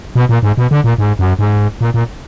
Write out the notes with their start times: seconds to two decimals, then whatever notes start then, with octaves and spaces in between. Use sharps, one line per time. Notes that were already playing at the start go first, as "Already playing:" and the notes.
0.15 B2
0.29 A#2
0.43 G#2
0.58 B2
0.71 D3
0.84 A#2
0.98 G#2
1.19 F#2
1.39 G#2
1.81 A#2
1.94 A#2